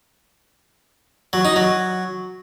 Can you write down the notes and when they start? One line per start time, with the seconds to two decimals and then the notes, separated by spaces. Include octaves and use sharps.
1.33 F#3
1.45 D#4
1.56 F#3